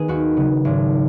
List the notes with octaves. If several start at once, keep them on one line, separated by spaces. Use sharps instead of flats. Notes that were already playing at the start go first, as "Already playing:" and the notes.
Already playing: D#3 B3 G#4
D#2 F#4
C#3 F#3 B3
G#1